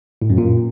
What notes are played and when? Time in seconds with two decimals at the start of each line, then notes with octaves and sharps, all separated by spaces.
0.22 A2
0.30 F#2
0.38 A#2